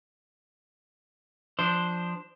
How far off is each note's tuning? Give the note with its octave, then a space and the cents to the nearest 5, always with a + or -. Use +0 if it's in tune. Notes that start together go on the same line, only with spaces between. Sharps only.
F3 +5 D4 +0 C5 +0